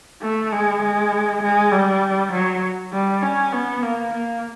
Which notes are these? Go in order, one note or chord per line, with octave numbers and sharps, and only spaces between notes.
A3
G#3
G#3
G#3
G3
F#3
G3
C#4
B3
A#3
A#3